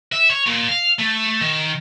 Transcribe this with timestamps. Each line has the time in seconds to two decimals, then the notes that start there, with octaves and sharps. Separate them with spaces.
0.12 E5
0.30 C#5
0.47 A#2
0.69 F5
0.99 A3
1.41 D#3